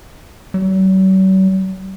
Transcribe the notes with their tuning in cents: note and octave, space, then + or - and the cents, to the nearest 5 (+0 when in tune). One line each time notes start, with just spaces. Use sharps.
F#3 +45